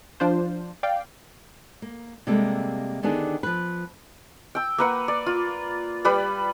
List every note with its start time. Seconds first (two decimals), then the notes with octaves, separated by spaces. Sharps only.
0.20 F3 D4 F4 C5
0.83 D5 F5 G5
1.82 A#3
2.27 C3 G3 G#3 A#3 A4 E5
3.03 D3 D#3 B3 D4 G4 G#4
3.43 F3 B4
4.55 G5 E6
4.78 A#3 B4 F#5
5.08 D5
5.26 F4
6.05 G3 B4 D5 B5